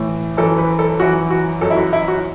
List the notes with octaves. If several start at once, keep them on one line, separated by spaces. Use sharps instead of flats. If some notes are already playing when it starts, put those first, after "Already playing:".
Already playing: A2 E3
F#2 E3 A4
B4
A4
F#2 E3 F#4
F#4
F#2 E3 A4
E4
F#4
E4
F#4